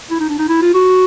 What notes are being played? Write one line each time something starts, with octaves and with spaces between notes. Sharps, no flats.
E4
D#4
D4
D#4
E4
F4
F#4